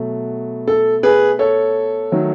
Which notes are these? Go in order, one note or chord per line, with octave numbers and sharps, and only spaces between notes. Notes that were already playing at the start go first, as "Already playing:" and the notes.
Already playing: B2 F#3 A3
A4
G#4 B4
A4 C#5
D#3 F#3 A3